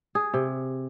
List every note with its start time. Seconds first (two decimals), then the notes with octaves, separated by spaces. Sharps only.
0.15 G#4
0.34 C3